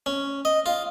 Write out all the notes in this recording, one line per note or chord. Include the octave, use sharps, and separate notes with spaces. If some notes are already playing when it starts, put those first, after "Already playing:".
C#4
D#5
F4